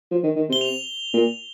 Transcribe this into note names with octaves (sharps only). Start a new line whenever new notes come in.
F3
D#3
D#3
C3 G7
F7
A#2